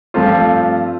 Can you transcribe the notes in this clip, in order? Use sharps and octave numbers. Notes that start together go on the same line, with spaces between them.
G2 F3 A3 C4 F4